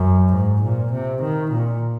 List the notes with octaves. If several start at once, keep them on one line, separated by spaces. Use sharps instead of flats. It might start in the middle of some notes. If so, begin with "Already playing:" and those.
Already playing: F#2
G#2
A#2
C3
D#3
A#2